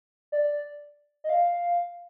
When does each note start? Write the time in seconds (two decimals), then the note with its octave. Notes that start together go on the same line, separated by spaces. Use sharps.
0.32 D5
1.24 D#5
1.29 F5